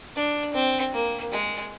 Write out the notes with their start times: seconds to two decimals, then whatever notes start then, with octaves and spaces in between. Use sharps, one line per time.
0.16 D4
0.54 C4
0.93 A#3
1.33 G#3